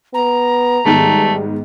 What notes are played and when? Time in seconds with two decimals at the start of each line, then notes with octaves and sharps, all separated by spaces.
0.14 B3 A#5
0.86 G#2 D#3 G3 A3 B3